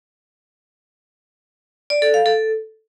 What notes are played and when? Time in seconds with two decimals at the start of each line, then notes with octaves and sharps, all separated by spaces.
1.90 D5
2.02 A4
2.14 F5
2.26 A4